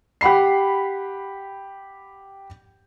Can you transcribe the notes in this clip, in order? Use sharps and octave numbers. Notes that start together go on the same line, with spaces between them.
G4 F#5 B5 C7